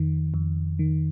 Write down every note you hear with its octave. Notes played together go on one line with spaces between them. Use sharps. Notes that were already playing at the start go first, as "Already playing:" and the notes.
Already playing: F2 D#3
F2
D#3